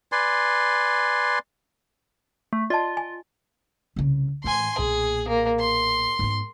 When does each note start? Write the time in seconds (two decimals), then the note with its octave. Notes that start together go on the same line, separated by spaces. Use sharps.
0.12 B4 D5 G#5 C6
2.53 A3
2.70 F4 D5 D#5 A5
2.97 G#5
3.96 C2 C#3
4.44 A2 E3 G#5 C6
4.78 B1 A#2 G#4
5.28 A#3
5.60 C6
6.19 G#2 B3